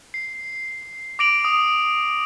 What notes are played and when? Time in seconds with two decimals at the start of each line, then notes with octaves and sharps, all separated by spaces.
0.14 C7
1.19 D6 A#6 D7 F7 F#7
1.45 D#6 F7